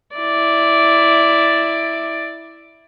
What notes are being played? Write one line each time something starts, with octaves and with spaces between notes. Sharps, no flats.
E4 D5